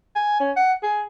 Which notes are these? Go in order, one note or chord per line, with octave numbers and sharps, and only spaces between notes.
G#5
C#4
F#5
G#4